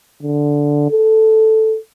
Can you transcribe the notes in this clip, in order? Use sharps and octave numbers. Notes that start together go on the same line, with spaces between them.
D3
A4